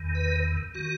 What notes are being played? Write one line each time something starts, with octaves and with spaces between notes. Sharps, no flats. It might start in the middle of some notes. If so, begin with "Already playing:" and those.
Already playing: E2 D#3
B4
D#3 F#4